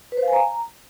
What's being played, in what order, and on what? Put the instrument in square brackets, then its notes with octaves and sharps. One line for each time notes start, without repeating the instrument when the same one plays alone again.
[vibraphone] B4
C5
F5
G#5
A#5